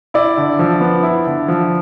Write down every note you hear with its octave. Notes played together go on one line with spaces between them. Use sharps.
E4 D5
D3
F3
B3
E4
D3
F3